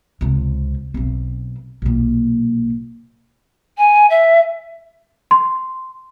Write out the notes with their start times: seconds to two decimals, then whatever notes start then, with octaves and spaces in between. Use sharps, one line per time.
0.21 C#2 C3
0.94 B1 C4
1.82 B1 A#2
3.78 G#5
4.10 E5
5.31 C6